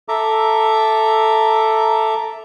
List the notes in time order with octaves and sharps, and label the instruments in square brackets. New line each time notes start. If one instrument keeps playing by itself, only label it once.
[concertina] A4 E5 A#5 D6